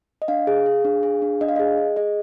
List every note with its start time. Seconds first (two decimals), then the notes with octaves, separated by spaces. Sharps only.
0.22 D#5
0.28 D4 F5
0.47 G#4
0.66 G#4
0.85 D4
1.03 G#4
1.22 D4
1.41 D4 D#5
1.48 F5
1.56 G#4 D#5
1.78 G#4
1.96 G#4 D#5